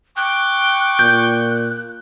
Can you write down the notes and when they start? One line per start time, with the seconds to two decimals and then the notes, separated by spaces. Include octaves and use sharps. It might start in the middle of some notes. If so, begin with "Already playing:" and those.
0.17 G5 C#6 D6 F#6
0.99 A#2 G6